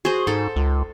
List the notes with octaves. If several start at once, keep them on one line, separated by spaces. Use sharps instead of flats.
F#4 G#4 C5
G#2 A4
C#2